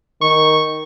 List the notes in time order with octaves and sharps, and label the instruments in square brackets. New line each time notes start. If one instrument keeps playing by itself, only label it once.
[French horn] D#3 [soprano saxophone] C#6